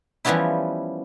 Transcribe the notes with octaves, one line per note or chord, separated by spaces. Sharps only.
E3 F3 G3 B3 C#4 E4